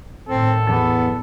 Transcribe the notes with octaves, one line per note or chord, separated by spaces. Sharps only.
A2 D#3 C4 A4
E2 B3 A5